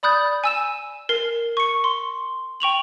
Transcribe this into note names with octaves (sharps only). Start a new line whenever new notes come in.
D5 B5 D#6 F#6 G6 A6
G#5 E6 E7
A#4 C7
C#6 C#7
C6
G5 C#6 F7 F#7